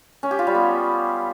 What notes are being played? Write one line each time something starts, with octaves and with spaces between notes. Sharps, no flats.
C#4
G4
F4
G3
B3